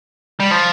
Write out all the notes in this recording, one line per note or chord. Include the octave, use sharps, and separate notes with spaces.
G3
F3